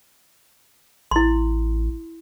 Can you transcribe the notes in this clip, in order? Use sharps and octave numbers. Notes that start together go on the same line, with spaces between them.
A1 E4 C6